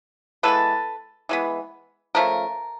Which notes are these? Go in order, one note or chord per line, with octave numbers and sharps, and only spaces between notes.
E3 G#3 B3 A4 B4
E3 G#3 B3
C#3 F3 A3 A#4